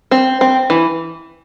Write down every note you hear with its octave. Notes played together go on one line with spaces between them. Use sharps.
C4
C4
E3